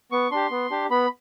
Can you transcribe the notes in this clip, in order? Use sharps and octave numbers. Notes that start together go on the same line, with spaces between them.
B3 C#6
D4 G4 C6
B3
D4 G4
B3 B5